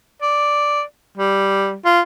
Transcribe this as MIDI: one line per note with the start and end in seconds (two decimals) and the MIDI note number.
0.22 0.82 74
1.17 1.75 55
1.85 2.01 65